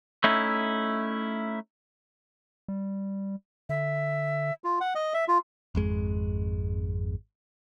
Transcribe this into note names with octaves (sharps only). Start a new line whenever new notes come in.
A3 C#4 D#4 E4
G3
D3 E5
F4
F#5
D#5
E5
F4
G#1 F2 G#3